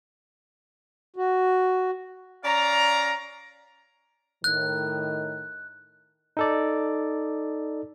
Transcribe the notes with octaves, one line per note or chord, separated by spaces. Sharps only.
F#4
C#4 D5 F5 A#5
A2 D#3 F#6
D#4 A4 D5